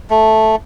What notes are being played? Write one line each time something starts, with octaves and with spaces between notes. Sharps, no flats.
A3